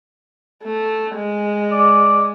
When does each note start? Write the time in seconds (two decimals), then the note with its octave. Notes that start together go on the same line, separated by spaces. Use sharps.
0.64 A3
1.15 G#3
1.72 D5